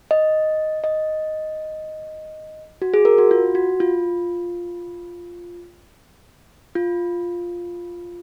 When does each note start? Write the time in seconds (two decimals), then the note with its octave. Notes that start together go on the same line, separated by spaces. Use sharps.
0.11 D#5
0.84 D#5
2.82 F#4
2.94 G#4
3.05 A#4
3.18 F#4
3.31 F4
3.55 F#4
3.80 F4
6.75 F4